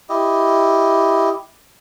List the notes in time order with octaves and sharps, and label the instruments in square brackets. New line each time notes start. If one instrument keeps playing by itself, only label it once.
[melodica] E4 G4 D#5